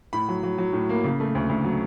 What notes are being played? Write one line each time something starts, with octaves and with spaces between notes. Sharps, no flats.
A2 B5
F#3
F#3
F#3
A2
A#3
C#3
A3
D2
D2
F#3